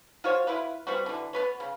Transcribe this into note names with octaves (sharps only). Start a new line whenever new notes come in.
F4 F#4 C5 C#5
E4 F4 B4
G3 B3 C4 F#4
D3 E3
B3 B4 C#5
C#3